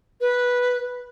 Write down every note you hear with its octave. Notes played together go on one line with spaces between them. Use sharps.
B4